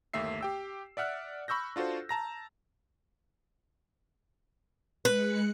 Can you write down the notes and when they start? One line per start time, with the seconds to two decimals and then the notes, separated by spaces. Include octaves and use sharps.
0.14 G1 D#2 A3 A#3 E5 C7
0.41 G4 G5 E6
0.97 D5 E5 F#5 F6 F#6
1.48 B5 C#6 E6 G6 A#6
1.76 D4 F4 F#4 A4 C5
2.09 A5 A#5 A#6
5.05 G#3 B4 F#6 C#7